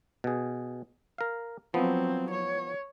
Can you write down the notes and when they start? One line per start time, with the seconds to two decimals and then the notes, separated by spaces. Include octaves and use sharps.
0.24 B2 G#4
1.18 A#4 F5
1.74 F3 F#3 B3 C4
2.31 C#5